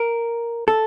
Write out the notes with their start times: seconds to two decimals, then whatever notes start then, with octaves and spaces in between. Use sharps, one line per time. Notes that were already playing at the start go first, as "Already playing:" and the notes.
Already playing: A#4
0.68 A4